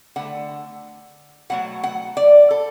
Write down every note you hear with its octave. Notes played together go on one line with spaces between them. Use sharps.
D3 A3 F#5
B2 F#3 A3 F#5
F#5
D5
A4